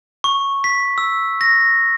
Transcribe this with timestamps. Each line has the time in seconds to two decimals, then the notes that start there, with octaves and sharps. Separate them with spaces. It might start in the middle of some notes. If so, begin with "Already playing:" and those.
0.24 C#6
0.64 B6
0.98 E6
1.41 A#6